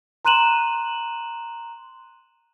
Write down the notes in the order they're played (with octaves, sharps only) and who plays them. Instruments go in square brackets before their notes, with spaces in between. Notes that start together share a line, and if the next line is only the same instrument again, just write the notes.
[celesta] A#5 C6 F#6 D#7 E7 F#7